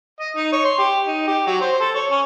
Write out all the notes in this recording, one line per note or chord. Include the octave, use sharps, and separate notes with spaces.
D#5
D#4
C#5
C6
G4
D#4
G4
F#3
C5
A4
C#5
C#4